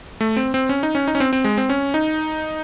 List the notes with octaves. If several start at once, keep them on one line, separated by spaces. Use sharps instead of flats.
A3
C4
C4
C#4
D#4
C#4
D#4
C#4
C4
C4
G#3
C4
C#4
D#4